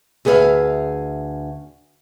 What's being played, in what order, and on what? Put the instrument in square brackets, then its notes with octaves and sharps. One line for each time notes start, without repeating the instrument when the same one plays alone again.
[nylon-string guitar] D2 G#4 B4 C#5 E5 F5